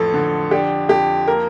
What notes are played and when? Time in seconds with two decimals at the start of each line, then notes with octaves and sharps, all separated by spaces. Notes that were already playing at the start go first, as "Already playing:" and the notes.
Already playing: A1 F2 A4
0.14 D3
0.51 D4 G4
0.89 F2 G4
1.27 A#3 A#4